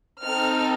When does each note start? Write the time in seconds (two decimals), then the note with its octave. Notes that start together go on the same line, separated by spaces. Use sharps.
0.23 C4 D#4 A4 F6